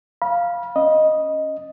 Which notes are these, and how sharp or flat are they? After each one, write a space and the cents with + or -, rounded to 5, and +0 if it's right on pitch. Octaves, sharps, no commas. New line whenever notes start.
F5 +0 B5 -30
C#4 +0 D#5 +0